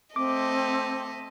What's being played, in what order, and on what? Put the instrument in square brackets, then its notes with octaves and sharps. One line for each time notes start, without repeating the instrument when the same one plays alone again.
[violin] A3 D#5 [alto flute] C4 [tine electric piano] D6